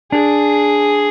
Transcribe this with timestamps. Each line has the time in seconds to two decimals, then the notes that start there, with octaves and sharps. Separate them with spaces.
0.12 D4 G#4